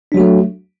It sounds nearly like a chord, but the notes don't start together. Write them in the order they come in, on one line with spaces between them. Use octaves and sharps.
D4 F#3 F#4 A3